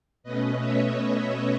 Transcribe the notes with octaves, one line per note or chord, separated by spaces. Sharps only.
B2 A3 C#4 B4 D#5
C#5 E5